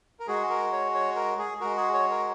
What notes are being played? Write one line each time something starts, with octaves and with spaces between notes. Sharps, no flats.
A#4
G#3 F#4 G#4
A#4
C#5
C#5
A#4
G#4
G#3 F#4 A#4
G#4
C#5
A#4